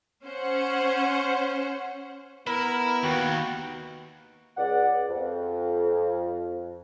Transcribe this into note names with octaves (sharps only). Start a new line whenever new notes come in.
C#4 C5 F#5
B3 E4 A#4 B5
D#2 F#4 G5
C#2 D5 F#5
F2